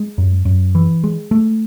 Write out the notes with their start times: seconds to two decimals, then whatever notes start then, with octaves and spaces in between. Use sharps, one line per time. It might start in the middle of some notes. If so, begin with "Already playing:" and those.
Already playing: G#3
0.18 F#2
0.45 F#2
0.75 E3
1.04 G#3
1.31 A3